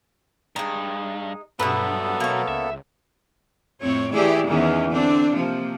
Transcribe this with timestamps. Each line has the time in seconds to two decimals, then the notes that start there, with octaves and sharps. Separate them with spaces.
0.56 G2 G#3 D#4
1.60 G2 B2 F#3 B3 A4 B4 E5
2.20 B2 A#3 C#5
2.48 C#2 E5
3.82 F2 A2 C4 C#5
4.13 E3 A3 E4 G4 G#4 D5
4.47 E2 D#3 E3 C#4
4.90 D3 C4 D4
5.33 C3 F3 A#3